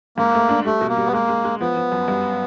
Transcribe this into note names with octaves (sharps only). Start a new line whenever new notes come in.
G#2 A#3
A3
D4
G3 A3
B2
A#3
G3
B3
G#3 A#3
G#3
G#3
F3 B3
F3
F#2
G2